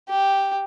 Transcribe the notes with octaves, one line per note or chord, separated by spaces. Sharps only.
G4